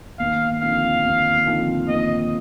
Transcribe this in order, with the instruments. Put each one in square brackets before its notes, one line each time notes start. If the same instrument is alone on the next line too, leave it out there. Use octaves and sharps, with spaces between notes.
[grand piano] D#2 [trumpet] F5
[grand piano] D3 F3 C4 D#4 [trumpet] F5
[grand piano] D#2
D3 F3 C4 D#4
[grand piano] D#2 [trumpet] D#5